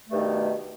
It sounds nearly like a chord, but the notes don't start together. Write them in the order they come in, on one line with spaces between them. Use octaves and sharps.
A3 G2 D#3 B2